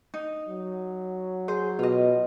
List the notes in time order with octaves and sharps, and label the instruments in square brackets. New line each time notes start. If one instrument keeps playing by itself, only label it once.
[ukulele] D#4
[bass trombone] F#3
[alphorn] G#4 [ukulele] C5
[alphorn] B2 [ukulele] F4 D#5